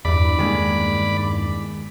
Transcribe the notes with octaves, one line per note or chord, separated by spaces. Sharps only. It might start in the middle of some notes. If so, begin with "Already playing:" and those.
E2 G2 D5 B5
D#3 G#3 A#3